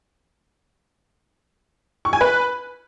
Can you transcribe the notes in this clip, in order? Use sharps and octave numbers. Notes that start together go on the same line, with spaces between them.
C#6
G#5
B4